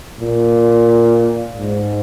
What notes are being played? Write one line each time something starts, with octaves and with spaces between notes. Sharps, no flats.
A#2
G#2